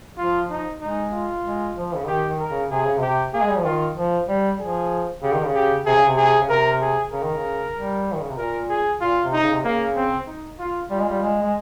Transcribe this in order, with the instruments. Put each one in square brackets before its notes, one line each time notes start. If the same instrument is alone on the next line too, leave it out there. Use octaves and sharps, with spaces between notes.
[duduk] F3 [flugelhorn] F4
[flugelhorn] D#4
[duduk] G#3 [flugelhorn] D#4
[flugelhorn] F4
[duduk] G#3
F3
C#3
[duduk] D#3 [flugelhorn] G4
[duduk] D#3
[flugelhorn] A#4
[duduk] C#3
[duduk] C3 [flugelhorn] G#4
[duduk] C#3
[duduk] C3 [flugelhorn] G4
[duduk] A#3 [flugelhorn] G#4
[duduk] G#3
G3
F3
[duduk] D#3 [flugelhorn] F4
[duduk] F3
G3
[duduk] F3 [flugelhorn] G#4
[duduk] C#3 [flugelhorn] G4
[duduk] D#3
C#3
[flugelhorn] G4
[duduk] C3 [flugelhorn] G#4
[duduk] C#3
C3
[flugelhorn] G#4
[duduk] C#3
[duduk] C3 [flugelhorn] A#4
[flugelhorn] G#4
[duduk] C#3 [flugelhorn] A#4
[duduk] D#3
C#3
G3
D#3
C#3
C3
[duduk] A#2 [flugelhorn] A#4
[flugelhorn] G#4
[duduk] A#2 [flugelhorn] F4
[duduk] C3
[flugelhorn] D#4
[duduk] C#3
C3
[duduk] C#3 [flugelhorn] A#3
[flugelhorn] C4
D#4
F4
[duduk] G3 [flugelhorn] F4
[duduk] G#3
G3
G#3
G#3